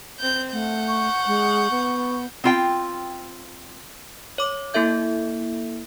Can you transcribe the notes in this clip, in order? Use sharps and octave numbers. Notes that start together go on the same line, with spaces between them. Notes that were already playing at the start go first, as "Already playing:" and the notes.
C4 G6
A3 F#5 G6
C#6
G#3
B3
C4 F4 G5
C#5 D6
A#3 E4 A4 E5 G6